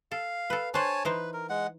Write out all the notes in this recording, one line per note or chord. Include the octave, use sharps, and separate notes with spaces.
A4 F5
A4 B4
D4 C5 C#5 F#5 G#5 A5
E3 D#4 B4 C5
A#4
G#3 F#5